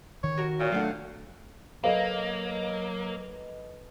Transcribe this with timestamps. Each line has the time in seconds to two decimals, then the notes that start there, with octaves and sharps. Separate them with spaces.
0.24 D#3 C#5
0.38 F#4 A#4
0.60 A#2 C#5
0.72 F#3 A3 D4 F5 F#5
1.84 F#3 A#3 A4 B4 D#5 F5